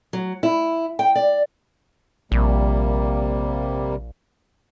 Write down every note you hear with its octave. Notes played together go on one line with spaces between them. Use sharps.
F#3
E4
G5
D5
A#1 C3 G3 A#3